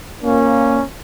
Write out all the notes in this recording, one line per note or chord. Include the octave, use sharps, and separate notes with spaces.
A#2 A#3 C#4